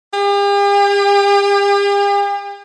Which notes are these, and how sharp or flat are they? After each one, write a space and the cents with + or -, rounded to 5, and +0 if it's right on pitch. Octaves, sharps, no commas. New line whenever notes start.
G4 +45